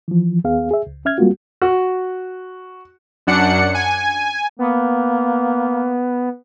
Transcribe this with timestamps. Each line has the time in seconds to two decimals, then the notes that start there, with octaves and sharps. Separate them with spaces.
0.08 E3 F3
0.44 D#2 B3 G#4 F5
0.71 G#4 E5
0.87 C#2
1.05 C#4 E5 F6 G#6
1.18 G3 G#3 A#3 C4 F4 F#4
1.62 F#4
3.27 F#2 D4 F#5 C#7
3.75 G#5
4.59 A#3 B3